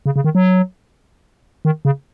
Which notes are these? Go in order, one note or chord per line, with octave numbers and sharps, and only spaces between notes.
C#3
C#3
D#3
F#3
D#3
C#3